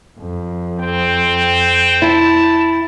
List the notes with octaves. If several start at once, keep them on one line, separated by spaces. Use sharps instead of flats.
F2
C4 G5
E4 A5